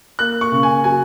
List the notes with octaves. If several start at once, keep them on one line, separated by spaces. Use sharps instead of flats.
A#3 F#6
C#6
C#3
G#5
F#3 G#5